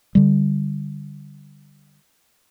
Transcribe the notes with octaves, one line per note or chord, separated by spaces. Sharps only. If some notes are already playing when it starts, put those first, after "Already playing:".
D3 G3